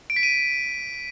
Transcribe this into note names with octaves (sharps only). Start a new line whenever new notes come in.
D7
B6
D#7